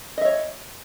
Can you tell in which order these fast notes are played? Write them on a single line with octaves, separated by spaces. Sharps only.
D#5 E5 C#5